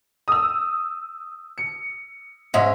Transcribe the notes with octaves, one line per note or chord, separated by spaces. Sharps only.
D#6 E6
C#7
G#2 C#4 D#5 E5